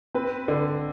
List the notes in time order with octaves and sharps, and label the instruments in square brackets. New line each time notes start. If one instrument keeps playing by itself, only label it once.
[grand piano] C4 [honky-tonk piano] B4
[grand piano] D3